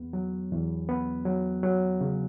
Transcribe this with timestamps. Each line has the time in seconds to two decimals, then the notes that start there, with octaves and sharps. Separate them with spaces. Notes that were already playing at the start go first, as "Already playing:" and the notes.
Already playing: E2 B3
0.13 F#3
0.52 E2
0.89 B3
1.25 F#3
1.63 F#3
2.01 C#3